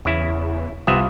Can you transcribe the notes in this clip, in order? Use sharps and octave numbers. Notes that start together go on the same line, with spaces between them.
E2 C#3 E4
C2 C3 B3 C4 F4 E5 D#6